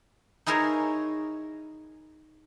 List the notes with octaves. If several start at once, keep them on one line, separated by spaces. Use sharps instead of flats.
D#4 E4 G#4 A#4 C5 C#5